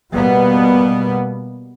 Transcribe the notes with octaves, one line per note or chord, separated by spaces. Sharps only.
B2 G3 A#3 B3